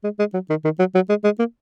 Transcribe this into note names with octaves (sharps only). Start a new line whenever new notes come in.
G#3
G#3
F#3
D#3
D#3
F#3
F#3
G#3
G#3
A#3